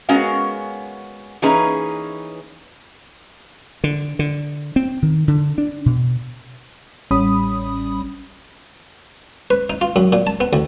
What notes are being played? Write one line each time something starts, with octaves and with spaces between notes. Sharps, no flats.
G#3 B3 C#4 F#4 A#4 F5
E3 A#3 C#4 D#4 G#4 B4
D3
D3
C4
D#3
D3
D4
B2
A1 G3 C#4 B5 D#6
B4
D#4
F4
F#2
A#2
A5
B3
D2